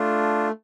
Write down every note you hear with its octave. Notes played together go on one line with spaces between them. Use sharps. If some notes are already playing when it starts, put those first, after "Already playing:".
Already playing: A3 D4 F4